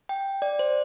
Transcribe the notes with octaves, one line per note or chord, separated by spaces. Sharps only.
G5
D5
C5